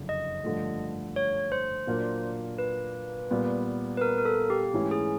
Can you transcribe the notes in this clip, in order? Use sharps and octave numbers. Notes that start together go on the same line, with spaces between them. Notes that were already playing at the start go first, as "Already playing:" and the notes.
Already playing: F#1 F2 D3 F#3
D#5
G2 D3 F3 A3
C#5
C5
A#2 F#3 A#3 D4 F4
B4
A#2 G3 B3
B4
A#4
A#4
A4
G4
G#2 E3 A3 C#4 E4
G#4